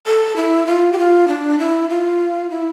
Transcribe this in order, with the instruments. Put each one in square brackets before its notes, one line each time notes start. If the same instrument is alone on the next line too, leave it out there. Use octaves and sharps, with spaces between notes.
[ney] A4
E4
F4
G4
F4
D4
E4
F4
E4